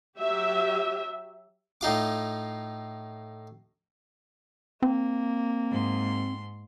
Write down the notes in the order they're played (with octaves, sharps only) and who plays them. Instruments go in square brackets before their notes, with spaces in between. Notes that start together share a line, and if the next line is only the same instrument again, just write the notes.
[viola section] F#3 G4 E5
[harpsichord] A2 D#4 F4 D6
[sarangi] A#3 [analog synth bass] C4
[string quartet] G#2 C6